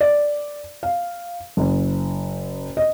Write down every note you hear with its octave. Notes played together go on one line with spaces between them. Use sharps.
D5
F5
F#1
D#5